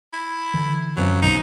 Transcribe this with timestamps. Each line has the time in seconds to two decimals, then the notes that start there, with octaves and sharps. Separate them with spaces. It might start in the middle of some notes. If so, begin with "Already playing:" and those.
0.13 E4
0.54 D3 E3
0.97 F#2 F#3 C4 F4
1.22 B1 B2 D#3 D#4